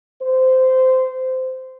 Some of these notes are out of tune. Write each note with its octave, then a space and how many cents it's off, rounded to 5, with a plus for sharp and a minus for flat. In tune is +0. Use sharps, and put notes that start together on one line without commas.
C5 -15